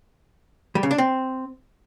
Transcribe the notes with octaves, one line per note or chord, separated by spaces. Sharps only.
G3
C#3
D4
C4